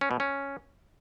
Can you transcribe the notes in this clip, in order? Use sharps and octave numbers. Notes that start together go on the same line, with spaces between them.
C#4
B2
C#4